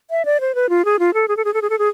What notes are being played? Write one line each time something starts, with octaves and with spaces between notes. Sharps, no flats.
E5
D5
C5
B4
F4
G#4
F4
A4
G#4
A4
G#4
A4
G#4
A4
G#4